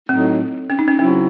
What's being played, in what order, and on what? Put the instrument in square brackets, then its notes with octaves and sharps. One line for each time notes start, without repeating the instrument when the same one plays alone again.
[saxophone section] A2 F#3 A3 D#4 [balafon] C4
[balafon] C#4
D#4
C#4
[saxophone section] C#3 F#3 C4 E4 [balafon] C#4